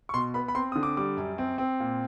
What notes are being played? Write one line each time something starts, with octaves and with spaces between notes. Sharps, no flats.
C#6
B2 C6
B3 B5
B5
C4 C6
D3 D#6
D6
G3 D6
F#2
C4
C4
A#2